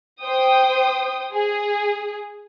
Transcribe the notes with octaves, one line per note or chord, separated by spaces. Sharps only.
C5 G5 D#6
G#4